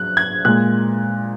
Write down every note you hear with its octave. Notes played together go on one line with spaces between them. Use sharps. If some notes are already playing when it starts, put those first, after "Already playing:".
Already playing: F#3 F#6
G#6
A#2 G#3 F#6